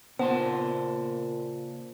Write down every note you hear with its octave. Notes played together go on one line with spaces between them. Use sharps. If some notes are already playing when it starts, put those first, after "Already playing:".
A#2 C#3 B3 C5 A5 C6